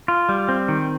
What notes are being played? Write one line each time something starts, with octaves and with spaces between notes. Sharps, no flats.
F4
G3
C4
D#3